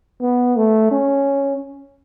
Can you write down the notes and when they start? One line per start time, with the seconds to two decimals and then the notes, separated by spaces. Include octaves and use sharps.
0.22 B3
0.57 A3
0.91 C#4